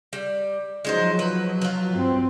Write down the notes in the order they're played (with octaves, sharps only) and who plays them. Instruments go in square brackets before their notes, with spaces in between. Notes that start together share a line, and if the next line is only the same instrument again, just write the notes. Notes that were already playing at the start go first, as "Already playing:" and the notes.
[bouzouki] G3
[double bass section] F3 F#3 [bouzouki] G#3 D#4 C5
[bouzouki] B4
F4 B4
[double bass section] G2 C4